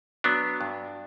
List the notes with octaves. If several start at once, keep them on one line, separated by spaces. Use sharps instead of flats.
F#3 B3 D4
G2